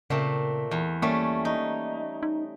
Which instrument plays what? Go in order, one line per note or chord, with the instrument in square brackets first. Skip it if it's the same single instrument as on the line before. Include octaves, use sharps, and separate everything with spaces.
[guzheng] A#2 A3 C4 [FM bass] C#3
[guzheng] E2
[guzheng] G3 A3 C#4 [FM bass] A#3
[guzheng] D#4
[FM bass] D#4